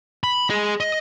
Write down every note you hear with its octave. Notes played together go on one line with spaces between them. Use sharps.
B5
G#4 D#5
D#5